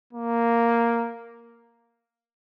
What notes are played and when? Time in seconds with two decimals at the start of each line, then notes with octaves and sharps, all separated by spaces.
0.13 A#3